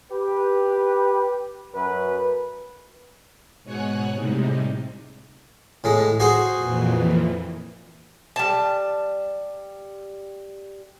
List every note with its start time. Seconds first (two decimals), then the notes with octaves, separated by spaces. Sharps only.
0.12 G4 B4
1.75 F#2 B4
3.64 G#2 B2 C#5 F#5 G#5 F#6
4.15 A2 C3 G3 G#3 D#4
5.84 A2 G#3
6.20 F#4 G#4 C5
6.55 F2 A#2 E3
8.36 G3 A5